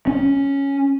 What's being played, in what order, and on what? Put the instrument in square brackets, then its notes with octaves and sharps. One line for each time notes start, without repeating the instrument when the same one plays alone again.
[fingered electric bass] C#4